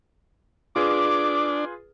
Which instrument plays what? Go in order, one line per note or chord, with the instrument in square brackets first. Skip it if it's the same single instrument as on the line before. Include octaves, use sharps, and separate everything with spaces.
[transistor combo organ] D4 [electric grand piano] F4 G#4 B4 [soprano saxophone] D6